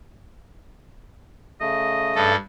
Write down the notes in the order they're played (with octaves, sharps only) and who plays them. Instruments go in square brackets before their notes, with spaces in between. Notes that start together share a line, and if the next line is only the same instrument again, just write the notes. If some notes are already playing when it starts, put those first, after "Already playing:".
[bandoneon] C#3 A3 [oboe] D#5
[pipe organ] G2 A4